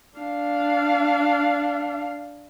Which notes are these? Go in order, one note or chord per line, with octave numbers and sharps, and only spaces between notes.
D4 F5